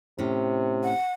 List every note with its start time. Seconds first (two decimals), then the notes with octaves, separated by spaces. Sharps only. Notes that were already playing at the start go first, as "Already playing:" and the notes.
0.19 A2 C3 C#4
0.84 F#5